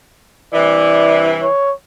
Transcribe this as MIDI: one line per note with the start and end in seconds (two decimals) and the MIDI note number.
0.53 1.46 43
0.53 1.46 48
0.53 1.46 52
0.53 1.26 74
1.42 1.73 73